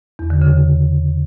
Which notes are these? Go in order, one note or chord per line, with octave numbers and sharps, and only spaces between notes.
E2
D3
C#3